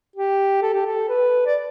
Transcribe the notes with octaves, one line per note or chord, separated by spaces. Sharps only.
G4
A4
G4
A4
B4
D5